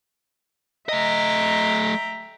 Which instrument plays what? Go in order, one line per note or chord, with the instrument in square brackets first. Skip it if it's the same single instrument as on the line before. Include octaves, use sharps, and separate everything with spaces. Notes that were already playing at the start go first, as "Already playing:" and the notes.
[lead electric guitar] A3 D#5 [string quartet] E5 G5 A#5